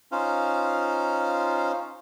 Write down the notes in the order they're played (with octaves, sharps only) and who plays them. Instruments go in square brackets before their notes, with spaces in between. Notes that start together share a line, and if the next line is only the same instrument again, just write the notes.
[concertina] C#4 D#4 F4 C5 F5